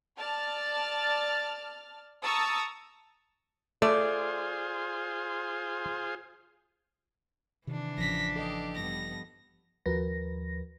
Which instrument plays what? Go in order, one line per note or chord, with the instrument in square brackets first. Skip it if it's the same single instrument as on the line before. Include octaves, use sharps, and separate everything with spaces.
[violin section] D5 A5 F6 A6
A5 A#5 C#6 D#6 E6 A6
[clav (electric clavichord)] A3 [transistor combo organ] F4 G#4 C5 [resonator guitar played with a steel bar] D5
[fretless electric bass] C3 D#3 [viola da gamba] E3 D4
[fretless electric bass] A1 C#3 [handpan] F3 [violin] A#6 B6
[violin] G4 [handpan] A4 D#5
[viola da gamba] G2 B3 [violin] A#6
[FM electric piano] D#2 F3 F#4 A#4 B4 A#6